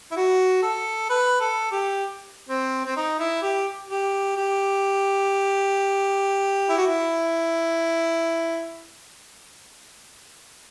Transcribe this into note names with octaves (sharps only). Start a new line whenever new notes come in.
E4
F#4
A4
B4
A4
G4
C4
C4
D#4
E4
G4
G4
G4
E4
F#4
E4